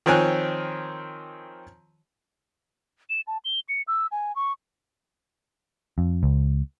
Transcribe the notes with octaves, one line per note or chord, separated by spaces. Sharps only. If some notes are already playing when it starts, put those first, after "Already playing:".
D#3 F3 C4 C#5 G#5 F#6
E7
A5
G7
C#7
E6
G#5
C#6
F2
C#2